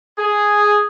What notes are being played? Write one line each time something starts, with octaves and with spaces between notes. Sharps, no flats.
G#4